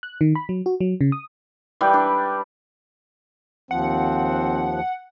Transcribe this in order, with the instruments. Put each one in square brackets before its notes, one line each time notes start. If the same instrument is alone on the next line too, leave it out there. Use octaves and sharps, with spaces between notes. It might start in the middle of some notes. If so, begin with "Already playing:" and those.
[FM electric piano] F#6
D#3
B5
F#3
F#4
F#3
C#3
D#6
[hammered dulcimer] E3 G3 B4 G5
D4 D5
[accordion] D#2 F3 [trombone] C4 [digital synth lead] F#5